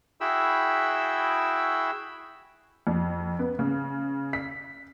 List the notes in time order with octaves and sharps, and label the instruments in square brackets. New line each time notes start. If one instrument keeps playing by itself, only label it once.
[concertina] E4 F#4 G#4 G5 B5 E6
[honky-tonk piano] F2
B3
C#3
B6